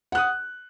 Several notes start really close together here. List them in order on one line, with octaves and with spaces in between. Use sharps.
F#5 F#6 D#6